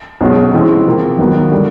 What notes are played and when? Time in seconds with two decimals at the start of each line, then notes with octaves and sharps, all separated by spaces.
0.21 B1 B2 G#3 C#4 F#4
0.53 C3 E3 G#3 C4
0.86 C3 F3 A#3
1.19 D#2 D#3 F#3 B3
1.52 D3 G3 A#3